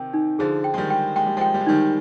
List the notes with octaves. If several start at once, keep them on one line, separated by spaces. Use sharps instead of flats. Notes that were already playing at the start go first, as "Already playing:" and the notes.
Already playing: C3 D#3 G5
D#4
D3 F3 G#4
G5
G#3
D#3 G3
G5
G#3 G5
G3
F3 G#3
G5
G3
G#3
D#3 G3 D#4